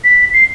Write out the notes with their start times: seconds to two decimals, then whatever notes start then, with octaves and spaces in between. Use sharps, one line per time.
0.04 B6
0.34 C7